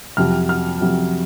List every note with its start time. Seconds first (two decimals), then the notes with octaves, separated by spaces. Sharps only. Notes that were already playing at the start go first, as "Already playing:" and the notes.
0.17 F2 C3 F#3 F6
0.49 F6
0.81 F2 C3 F#3